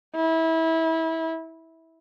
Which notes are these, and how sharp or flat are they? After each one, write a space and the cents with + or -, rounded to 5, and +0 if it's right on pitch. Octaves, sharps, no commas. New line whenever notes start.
E4 -25